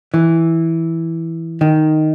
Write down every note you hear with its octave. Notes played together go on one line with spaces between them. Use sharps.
E3
D#3